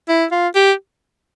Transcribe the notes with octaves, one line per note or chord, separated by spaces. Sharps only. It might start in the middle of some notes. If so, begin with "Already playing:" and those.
E4
F4
G4